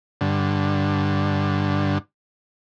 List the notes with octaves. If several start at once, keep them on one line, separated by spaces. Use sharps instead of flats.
G2 D3